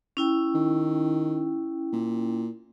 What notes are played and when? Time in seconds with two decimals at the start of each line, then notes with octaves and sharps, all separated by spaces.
0.17 C#4 E4 G5
0.54 D#3
1.93 A#2